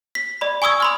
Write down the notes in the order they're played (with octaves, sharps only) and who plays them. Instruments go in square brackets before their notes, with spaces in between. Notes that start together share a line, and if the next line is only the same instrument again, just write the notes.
[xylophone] B6
D5 B5
G#5 C#6 D#6 E6 G#6
B5 C6 F6